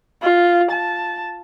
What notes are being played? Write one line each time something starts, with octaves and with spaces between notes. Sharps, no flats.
F4
A5